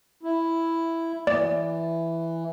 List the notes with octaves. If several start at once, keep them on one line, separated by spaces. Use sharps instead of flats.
E4
E3 D5